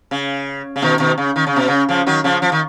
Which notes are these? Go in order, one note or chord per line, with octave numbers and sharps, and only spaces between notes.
C#3
C#3
B2 D#3
B2 D#3
C#3
D#3
C#3
B2
C#3
C#3 F3
D#3 F#3
C#3 F3
F3
D#3